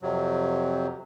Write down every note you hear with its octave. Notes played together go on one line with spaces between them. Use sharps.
F2 C3 F#3